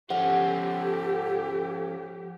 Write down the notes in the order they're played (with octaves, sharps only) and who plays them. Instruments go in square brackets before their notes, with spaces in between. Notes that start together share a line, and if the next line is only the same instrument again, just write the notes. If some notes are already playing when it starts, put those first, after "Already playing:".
[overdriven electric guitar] F3 C#4 [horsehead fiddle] G4 [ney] A4 [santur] F#5